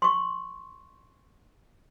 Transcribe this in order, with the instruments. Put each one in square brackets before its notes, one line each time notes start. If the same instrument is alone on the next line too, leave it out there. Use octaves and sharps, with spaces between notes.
[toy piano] C6 C#6